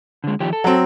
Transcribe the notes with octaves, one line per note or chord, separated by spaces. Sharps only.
D3 G#3
D#3 F3 G4
A4
F#3 C4